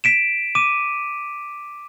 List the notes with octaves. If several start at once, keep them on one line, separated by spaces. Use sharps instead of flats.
B6 D7 E7
D6 D#7 E7